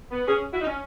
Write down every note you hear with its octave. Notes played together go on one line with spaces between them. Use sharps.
B3
C#4 G#4
E4 F#4
D#4
C#4